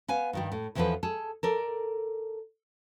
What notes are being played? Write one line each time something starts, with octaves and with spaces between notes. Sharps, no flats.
B3 F5 G#5
G2 D#3 G3
A2
E2 E3 F3 C4 A4 B4
G#4 A4
A4 A#4 D5